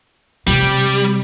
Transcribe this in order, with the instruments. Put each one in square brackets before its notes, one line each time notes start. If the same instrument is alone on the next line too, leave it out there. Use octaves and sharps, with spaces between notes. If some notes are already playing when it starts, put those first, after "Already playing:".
[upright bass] C3 [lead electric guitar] G3